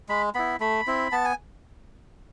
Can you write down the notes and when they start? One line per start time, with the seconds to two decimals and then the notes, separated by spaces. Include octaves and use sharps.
0.09 G#3 B5
0.35 B3 E4 B5
0.60 A3 B5
0.87 C4 E4
1.12 B3 A5
1.25 G#5